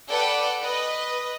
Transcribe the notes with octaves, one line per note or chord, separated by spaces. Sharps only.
A4 B4 D5 F#5 G5
B4 D#5